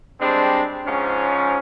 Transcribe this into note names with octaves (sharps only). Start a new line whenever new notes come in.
G3 G#3 C4 D4
G#2 F3 C#4